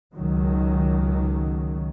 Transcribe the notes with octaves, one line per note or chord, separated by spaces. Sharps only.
C#2 D#3 F#3